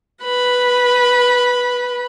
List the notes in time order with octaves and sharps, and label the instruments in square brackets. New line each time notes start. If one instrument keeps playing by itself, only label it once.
[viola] B4 B5